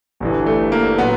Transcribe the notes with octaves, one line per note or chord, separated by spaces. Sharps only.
G1 G2 E3
A3
A#3
A#2 F#3 B3